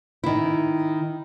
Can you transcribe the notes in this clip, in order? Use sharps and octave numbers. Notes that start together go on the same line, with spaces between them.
D#3 E4